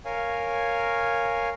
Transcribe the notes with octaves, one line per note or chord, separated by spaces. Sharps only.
A#4 C#5 F5 G#5